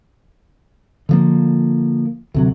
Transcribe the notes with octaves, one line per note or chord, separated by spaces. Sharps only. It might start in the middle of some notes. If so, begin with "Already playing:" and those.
D3 F3 A#3
D2 C3 F#3